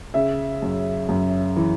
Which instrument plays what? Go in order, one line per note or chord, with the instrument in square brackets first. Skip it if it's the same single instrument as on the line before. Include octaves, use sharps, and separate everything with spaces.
[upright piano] C#3 E5
F#2
F#2
E3